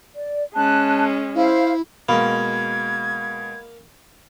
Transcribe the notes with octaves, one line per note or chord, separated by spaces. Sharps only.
D5
G#3 C#4 A5 F#6
E4 C5 F5
B2 G#3 A#3 B5 G#6